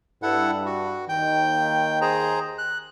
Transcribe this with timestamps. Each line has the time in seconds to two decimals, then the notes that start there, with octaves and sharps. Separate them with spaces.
0.23 G2 E4 A4 F#5
0.65 F#4
1.09 D#2 D#3 G5
2.01 G#4 C5 A#5
2.58 F#6